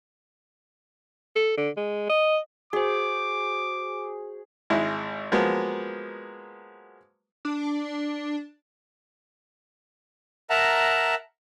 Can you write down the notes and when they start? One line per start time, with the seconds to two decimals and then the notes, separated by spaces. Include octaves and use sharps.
1.36 A4
1.57 D3
1.77 G#3
2.09 D#5
2.73 F#4 G#4 C5 D6
4.70 G#1 G#3 E4
5.32 F3 F#3 G#3 A#3 B3
7.45 D4
10.50 A#4 E5 F#5 A5 A#5